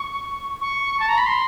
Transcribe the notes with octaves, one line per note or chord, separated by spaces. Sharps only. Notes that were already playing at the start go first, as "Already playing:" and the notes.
Already playing: C#6
C#6
A5
A#5
B5
C6